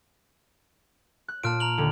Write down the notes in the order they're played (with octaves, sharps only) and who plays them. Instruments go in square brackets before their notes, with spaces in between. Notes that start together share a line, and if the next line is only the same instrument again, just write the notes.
[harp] F#6
[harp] A#2 [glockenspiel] A5 F6 D7
[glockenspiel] A#5 F7 F#7
[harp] D#2 D3